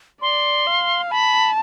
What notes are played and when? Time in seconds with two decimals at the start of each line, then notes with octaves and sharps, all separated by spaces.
0.22 D5 C6
0.67 F5
1.10 A5 B5